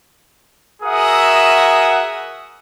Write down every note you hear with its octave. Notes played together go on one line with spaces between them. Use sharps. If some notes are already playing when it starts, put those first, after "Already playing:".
F#4 G#4 A#4 E5 F#5 D#6